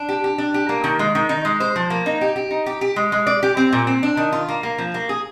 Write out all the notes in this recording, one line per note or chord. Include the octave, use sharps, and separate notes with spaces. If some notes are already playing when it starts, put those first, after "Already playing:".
Already playing: D4
G4
G4
D4
G4
A#3
D#3
G#3
D#3
D#4
G#3
C5
F3
A#3
D#4
G4
G4
D#4
G4
G4
G#3
G#3
D5
G4
C4
A#2
C4
D4
D#3
F4
A#3
A#3
F3
A#3
G#4